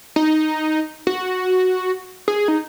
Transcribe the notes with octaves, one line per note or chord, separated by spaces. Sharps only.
D#4
F#4
G#4
D#4